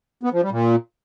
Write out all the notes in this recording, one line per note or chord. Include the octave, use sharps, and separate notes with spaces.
B3
F3
G3
A#2